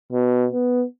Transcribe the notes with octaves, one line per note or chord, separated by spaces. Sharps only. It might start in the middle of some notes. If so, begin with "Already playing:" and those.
B2
B3